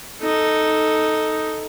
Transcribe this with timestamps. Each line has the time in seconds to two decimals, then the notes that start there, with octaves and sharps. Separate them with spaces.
0.22 D#4 A4